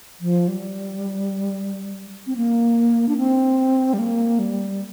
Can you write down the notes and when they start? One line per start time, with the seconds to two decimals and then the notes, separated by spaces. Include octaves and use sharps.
0.21 F3
0.48 G3
2.27 C4
2.36 A#3
3.09 D4
3.17 C4
3.94 G3
3.99 A#3
4.39 G3